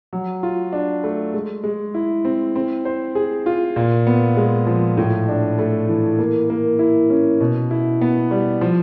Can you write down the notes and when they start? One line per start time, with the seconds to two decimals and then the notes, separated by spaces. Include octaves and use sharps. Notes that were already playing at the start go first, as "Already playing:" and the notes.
0.13 F#3
0.43 F4
0.73 D4
1.04 A3
1.33 G#3
1.64 G#3
1.94 E4
2.25 C4
2.56 C4
2.85 C5
3.15 G#4
3.46 F4
3.76 A#2
4.07 B3
4.37 G#3
4.67 F3
4.97 A2
5.28 D4
5.59 A3
5.89 E3
6.19 A#3
6.50 A#3
6.79 E4
7.10 C#4
7.40 B2
7.71 E4
8.01 B3
8.31 G3
8.61 F3